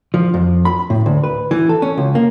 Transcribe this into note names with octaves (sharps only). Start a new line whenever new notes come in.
F3
F2
B5
A2
D2
B4
E3
A4
C#4
C#2
A#3